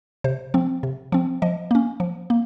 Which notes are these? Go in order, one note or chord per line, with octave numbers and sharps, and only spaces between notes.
C3 C5
F3 C4
C3
F3 C4
F3 D#5
A#3 C#4
F3
A#3